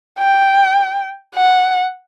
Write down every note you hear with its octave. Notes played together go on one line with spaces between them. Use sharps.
G5
F#5